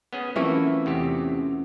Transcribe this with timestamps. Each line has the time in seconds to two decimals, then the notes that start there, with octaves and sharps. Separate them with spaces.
0.13 B3 C#4 G#4
0.36 E3 A3 A#3 C4 C#4 E4 F4 E5
0.86 E2 C3 G4